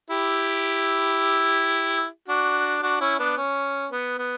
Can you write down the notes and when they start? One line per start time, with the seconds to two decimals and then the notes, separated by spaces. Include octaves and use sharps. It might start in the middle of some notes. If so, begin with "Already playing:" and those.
0.11 E4 G4
2.28 D4 F#4
2.83 D4 F#4
3.01 C#4 E4
3.19 B3 D4
3.37 C#4
3.92 B3
4.18 B3